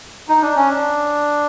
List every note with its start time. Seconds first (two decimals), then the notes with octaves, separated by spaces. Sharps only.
0.29 D#4
0.42 D4
0.56 C#4
0.68 D4